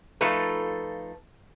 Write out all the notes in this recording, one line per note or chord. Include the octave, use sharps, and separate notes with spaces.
F3 A3 D#4 F4 A4 B4